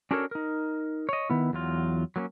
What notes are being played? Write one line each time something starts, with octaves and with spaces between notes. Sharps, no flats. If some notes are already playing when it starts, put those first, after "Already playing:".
C#4 D4 F#4 A4 A#4 C#5
D#4 A#4
C#5 D#5
D#3 B3 E4
E2 F#3 F4
F#3 A#3 B3 C#4